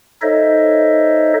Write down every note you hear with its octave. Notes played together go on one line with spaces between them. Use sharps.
D#4 A4 C5 C#5 D#5 E5